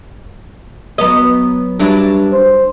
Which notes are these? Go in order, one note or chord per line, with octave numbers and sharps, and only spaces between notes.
F#3 B3 D#5
G2 F#3 D4 E4
C5